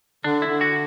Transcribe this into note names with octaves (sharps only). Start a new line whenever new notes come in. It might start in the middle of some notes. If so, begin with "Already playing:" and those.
D3 D4
E4
D3
F#4